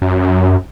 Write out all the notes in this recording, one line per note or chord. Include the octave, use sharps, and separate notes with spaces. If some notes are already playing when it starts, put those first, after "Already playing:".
F#2